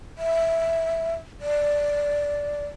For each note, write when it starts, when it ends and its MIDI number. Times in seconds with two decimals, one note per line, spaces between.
0.18 1.13 76
1.41 2.66 74